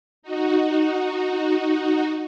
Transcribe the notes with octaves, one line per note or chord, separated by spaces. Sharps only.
D#4 F#4